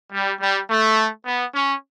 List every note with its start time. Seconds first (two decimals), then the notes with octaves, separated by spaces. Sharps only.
0.11 G3
0.40 G3
0.68 A3
1.25 B3
1.53 C#4